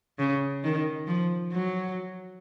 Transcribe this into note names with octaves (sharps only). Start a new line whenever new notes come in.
C#3
D#3
F3
F#3